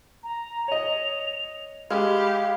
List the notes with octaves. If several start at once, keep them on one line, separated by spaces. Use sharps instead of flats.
A#5
C#5 D#5 F7
G#3 G4 F5 B5